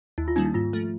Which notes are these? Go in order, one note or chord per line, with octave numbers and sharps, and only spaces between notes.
D#2 E4
F4
D#3 G3 A#3 C#4 D#4
E4
G#2 F4
F3 A3